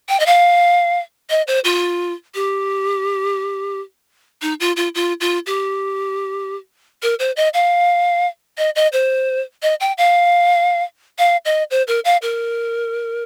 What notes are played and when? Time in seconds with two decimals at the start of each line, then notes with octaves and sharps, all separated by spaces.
0.09 G5
0.20 D#5
0.26 F5
1.30 D#5
1.47 C5
1.64 F4
2.35 G4
4.42 D#4
4.60 F4
4.76 F4
4.95 F4
5.21 F4
5.46 G4
7.03 A#4
7.19 C5
7.37 D#5
7.54 F5
8.58 D#5
8.76 D#5
8.93 C5
9.63 D#5
9.80 G5
9.98 F5
11.19 F5
11.45 D#5
11.71 C5
11.88 A#4
12.05 F5
12.22 A#4